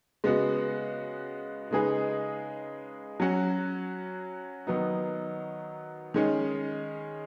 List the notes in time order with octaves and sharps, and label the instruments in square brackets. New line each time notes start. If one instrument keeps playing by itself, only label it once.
[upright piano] C#3 G#3 B3 F#4
C#3 G#3 D#4 G#4 B4
F#3 C#4 F#4
D#3 F#3 B3 D#4
D#3 G#3 C#4